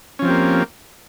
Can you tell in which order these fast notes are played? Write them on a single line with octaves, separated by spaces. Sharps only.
C#4 F3 C4 G4 A#3